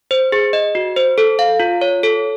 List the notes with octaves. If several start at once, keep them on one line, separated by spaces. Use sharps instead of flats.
C5
G#4
D#5
F#4
C5
A4
F5
F4
C#5
A4